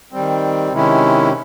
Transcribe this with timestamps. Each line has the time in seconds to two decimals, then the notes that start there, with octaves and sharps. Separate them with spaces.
0.12 D#3 G3 C4
0.72 C3 D#3 G#3 C#4 E4